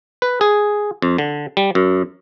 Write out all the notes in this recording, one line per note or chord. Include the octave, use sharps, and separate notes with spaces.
B4
G#4
F2
D3
G3
F#2